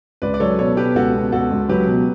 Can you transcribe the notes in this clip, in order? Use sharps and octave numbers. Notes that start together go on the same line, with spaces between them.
C#2 B4 D5
D5
F#3 A4 C#5
B2 A4 C#5
B2 G4 B4
C#2 F#4 A4
B2
C#2 F#4 A4
C#2
F#3 G4 B4
B2